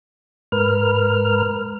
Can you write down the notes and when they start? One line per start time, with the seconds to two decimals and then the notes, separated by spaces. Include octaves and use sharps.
0.52 G#2 A#4 B4 F6